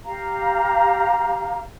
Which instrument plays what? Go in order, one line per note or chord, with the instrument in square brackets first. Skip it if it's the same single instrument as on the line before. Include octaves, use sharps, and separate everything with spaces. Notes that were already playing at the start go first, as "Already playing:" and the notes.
[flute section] G4 F5 A#5